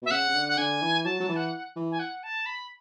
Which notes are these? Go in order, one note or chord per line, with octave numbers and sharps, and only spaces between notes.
B2 E5
C#3 F#5
C#3
D3
F#5
D3 G#5
E3
F#3 A5
F#3
E3
F#5
E3
G#5
F#5
A5
B5